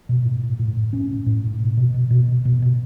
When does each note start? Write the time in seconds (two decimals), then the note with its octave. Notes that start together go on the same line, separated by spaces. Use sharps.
0.09 B2
0.25 A2
0.43 A2
0.59 A2
0.77 A2
0.93 A2 C#4
1.11 A2
1.26 A2
1.44 A2
1.60 B2
1.77 B2
1.94 B2
2.11 B2
2.28 B2
2.45 B2
2.62 B2